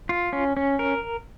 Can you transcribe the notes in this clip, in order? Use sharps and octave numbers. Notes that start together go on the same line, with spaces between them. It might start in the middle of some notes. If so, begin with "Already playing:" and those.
F4
C#4
C#4
A#4